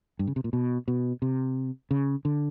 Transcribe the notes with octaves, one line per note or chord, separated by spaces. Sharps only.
G2
C#3
C3
A#2
B2
B2
C3
C#3
D3